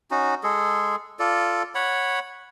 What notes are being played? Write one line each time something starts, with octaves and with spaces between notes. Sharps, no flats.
C#4 D#4 F#4
G#3 G#4 A4
F4 A4 D5
C#5 F#5 B5